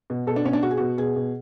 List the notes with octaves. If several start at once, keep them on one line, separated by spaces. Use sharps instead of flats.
B2
B2 A4
D4
B2 C#4
D4
B2 F#4
G#4
B2 F#4
B2 G#4
B2